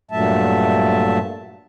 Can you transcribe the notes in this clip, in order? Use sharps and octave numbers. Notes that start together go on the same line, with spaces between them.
G2 A#2 F#3 A3 E5 A5